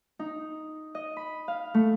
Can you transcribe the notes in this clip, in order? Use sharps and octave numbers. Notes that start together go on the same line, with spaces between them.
D#4
D#5
B5
F5
A3